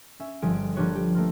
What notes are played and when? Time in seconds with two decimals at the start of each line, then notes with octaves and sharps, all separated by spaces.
0.20 C#4 E5
0.42 G1 F3 G3 G#4 D#6 D7
0.76 F3 A#3 D4 G4 B4 C#5
0.95 G4
1.15 A3 A#3 F4